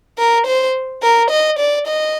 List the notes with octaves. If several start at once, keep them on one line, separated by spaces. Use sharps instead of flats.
A#4
C5
A#4
D#5
D5
D#5